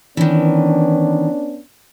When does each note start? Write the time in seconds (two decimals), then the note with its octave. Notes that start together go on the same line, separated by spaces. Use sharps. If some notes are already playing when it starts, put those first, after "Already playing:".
0.17 D#3 E3 B3 C#4 D4